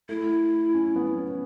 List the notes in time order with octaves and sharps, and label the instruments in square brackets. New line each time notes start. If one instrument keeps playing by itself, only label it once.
[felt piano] A3 [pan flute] E4
[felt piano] C#4
B3
C#4